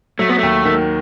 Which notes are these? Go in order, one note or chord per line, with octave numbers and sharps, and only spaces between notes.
F#3 A3
B3
D#2 A3
D#3